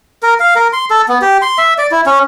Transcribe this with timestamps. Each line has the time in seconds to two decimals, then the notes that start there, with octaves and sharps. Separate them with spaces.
0.23 A#4
0.40 F5
0.55 A#4
0.73 C6
0.90 A4
1.08 B3
1.22 G4
1.42 C6
1.58 E5
1.78 D5
1.91 E4
2.06 C#4